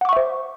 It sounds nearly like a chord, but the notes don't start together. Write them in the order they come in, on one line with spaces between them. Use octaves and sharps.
F#5 D6 C#6 E5 C5